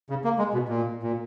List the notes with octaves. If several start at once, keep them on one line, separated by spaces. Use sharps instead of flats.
C#3
A#3
G#3
B2
A#2
A#2